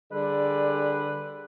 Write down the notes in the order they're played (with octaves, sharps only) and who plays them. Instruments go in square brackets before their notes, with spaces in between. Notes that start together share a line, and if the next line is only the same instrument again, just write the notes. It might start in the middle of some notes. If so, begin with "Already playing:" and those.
[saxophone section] D3 G3 [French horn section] G#4 [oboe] B4 [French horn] D5